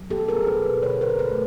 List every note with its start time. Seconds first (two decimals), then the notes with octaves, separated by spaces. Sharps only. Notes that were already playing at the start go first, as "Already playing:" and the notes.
Already playing: F#3
0.10 B3 G4 A4
0.28 G#4 A#4
0.35 B3
0.47 A4 B4
0.59 B2
0.83 D3 B4 C#5
1.01 A#4 C5
1.07 D3
1.19 A4 B4
1.31 A3